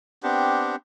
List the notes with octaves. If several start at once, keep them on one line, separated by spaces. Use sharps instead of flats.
B3 C4 D4 G4